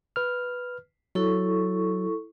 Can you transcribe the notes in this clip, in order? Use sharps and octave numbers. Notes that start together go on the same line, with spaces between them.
B4 F6
F#3 E4 A4 C#6